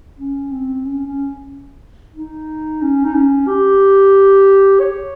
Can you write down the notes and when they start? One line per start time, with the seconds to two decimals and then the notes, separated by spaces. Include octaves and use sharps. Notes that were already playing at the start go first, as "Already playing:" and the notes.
0.19 C#4
0.52 C4
0.85 C#4
1.07 C#4
2.16 D#4
2.82 C#4
3.05 D#4
3.15 C#4
3.48 G4
4.80 C#5